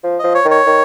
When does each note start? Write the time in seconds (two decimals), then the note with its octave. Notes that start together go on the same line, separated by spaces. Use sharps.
0.04 F3
0.19 F3 D#5
0.35 C#5
0.45 D#3
0.51 C#5
0.66 D#3